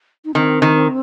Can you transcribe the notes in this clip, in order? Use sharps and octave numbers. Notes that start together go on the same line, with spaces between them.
D#4
D#3 C4
D#3